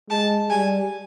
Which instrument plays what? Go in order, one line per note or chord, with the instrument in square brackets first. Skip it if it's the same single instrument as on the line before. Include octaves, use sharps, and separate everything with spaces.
[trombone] G#3 [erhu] A5
[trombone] G3 [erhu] G#5